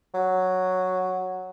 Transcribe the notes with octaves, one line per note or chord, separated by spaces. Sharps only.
F#3